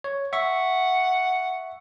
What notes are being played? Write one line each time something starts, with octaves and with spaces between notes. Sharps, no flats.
C#5
E5 F#5 C#6